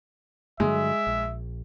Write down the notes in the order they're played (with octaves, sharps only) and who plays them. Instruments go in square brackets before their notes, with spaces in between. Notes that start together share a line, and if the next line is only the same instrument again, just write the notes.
[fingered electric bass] G2 D3 F#3 [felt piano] G#3 [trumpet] E5
[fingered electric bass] A#1